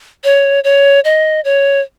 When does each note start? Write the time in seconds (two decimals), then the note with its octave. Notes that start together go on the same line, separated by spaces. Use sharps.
0.24 C#5
0.64 C#5
1.04 D#5
1.44 C#5